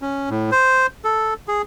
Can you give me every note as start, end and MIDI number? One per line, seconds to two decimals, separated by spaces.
0.02 0.30 61
0.30 0.50 45
0.52 0.87 72
1.04 1.34 69
1.48 1.62 68